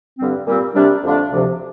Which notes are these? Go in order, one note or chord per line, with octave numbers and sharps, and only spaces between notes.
G2 D3 G3 C4
A#2 G3 C4
C3 G3 D4
F2 D3 A3 D4 F4
D2 C3 F3